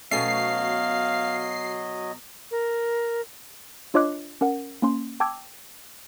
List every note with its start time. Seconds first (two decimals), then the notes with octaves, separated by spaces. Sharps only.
0.11 B2 F#3 A3 C#4 D#5 F5 C7
2.51 A#4
3.94 D4 F4 C#5 D#5 D6 F#6
4.41 C#4 A#4 F#5
4.82 A#3 C#4 C6
5.20 G5 A5 D6 E6 G#6